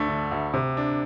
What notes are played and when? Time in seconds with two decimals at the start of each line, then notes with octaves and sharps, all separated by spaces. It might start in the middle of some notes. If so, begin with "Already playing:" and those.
Already playing: D2 A3 D4
0.08 D3
0.32 D2
0.54 C3
0.77 D4